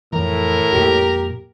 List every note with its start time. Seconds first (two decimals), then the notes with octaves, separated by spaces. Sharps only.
0.13 F2 A2 E3 A#4
0.73 F2 A#2 A#3 G4